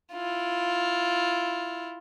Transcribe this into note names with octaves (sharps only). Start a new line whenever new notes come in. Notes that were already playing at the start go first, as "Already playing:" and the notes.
E4 F4